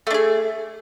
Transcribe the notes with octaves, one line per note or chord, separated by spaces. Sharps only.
A3 D4 G#4